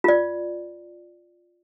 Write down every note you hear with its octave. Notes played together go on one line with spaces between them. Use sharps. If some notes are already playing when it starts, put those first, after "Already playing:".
F4 D5